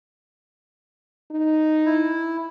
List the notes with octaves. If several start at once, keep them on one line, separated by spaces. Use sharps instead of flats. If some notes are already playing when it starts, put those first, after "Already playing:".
D#4
E4